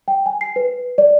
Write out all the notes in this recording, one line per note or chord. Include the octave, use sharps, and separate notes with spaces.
G5
G#5
C7
B4
D5